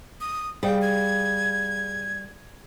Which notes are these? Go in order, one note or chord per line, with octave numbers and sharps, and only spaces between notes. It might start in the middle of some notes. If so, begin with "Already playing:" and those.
D#6
G3 G#4 F5 G5
G#6